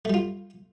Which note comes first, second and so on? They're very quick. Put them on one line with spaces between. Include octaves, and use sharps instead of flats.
A3 G3 F4